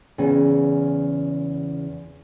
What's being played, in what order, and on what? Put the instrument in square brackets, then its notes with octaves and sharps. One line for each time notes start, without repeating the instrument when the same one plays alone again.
[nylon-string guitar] E2 C#3 G#5